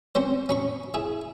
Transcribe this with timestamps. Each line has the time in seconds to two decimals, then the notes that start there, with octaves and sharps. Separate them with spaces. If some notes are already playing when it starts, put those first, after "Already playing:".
0.15 C4 C#4 C5
0.49 C#4 B5 C#6
0.94 E4 G#4